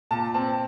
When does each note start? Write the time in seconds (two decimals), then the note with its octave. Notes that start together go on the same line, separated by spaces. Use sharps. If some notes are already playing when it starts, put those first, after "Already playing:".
0.11 A#2 A5
0.34 C4 A5